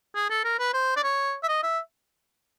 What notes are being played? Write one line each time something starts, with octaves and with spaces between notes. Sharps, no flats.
G#4
A4
A#4
B4
C5
D5
C#5
E5
D#5
E5